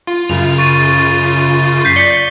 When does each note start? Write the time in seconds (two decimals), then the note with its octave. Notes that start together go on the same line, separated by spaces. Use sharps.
0.07 F4
0.29 F#2 C#3 F4 F7
0.58 C#6 A6 D#7
1.85 G6 B6 C7
1.96 D5 B6 C#7 G7